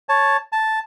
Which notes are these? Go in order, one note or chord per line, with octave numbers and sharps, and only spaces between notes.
C#5 A5
A5